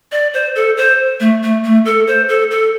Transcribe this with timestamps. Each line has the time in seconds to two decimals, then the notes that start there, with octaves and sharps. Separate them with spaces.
0.12 D5
0.34 C5
0.56 A4
0.77 C5
1.20 A3
1.43 A3
1.64 A3
1.85 A4
2.07 C5
2.29 A4
2.51 A4